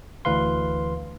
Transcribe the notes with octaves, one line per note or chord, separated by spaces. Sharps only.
D2 E3 B4 F5 C6